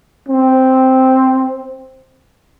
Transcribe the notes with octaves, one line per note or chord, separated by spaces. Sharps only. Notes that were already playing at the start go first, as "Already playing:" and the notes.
C4